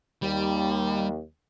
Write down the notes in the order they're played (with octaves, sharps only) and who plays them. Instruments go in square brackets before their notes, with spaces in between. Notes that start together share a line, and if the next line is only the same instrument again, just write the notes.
[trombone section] D#2 [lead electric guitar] G3